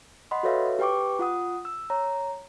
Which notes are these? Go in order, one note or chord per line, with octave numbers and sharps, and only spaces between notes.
D#5 F#5 B5 C6
F#4 A4 B4 C#5 E5 F5
G4 B4 G5 C#6 D6
F4 F#5 D#6
E6
C#5 A#5